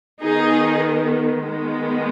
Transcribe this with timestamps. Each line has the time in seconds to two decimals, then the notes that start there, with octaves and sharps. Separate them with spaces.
0.23 D#3 B3 D#4 G#4
1.43 D#3 G#3 B3